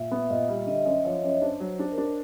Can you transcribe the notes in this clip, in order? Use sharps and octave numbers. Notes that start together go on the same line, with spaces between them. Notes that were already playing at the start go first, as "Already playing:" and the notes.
Already playing: A#2 E5
B3
A#2 D#5
G3
D3 D#5
F#2
F3 C#5
F#2
D4 C5
F#3
C5
D4
A#4
D4